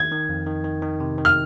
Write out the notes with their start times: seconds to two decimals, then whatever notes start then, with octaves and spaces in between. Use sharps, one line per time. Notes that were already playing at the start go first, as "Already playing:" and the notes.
Already playing: D#3 G#6
0.12 D#3
0.29 F2
0.46 D#3
0.64 D#3
0.83 D#3
1.00 C3
1.18 D#3
1.25 F6